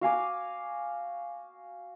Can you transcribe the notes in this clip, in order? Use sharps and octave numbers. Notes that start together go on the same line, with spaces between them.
F#4 F5 G#5 D6